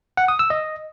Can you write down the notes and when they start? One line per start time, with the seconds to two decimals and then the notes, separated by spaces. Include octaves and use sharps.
0.17 F#5
0.28 D#6
0.39 E6
0.50 D#5